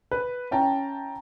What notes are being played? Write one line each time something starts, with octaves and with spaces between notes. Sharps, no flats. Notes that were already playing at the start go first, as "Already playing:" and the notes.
B4
C#4 E4 G5 A5 A#5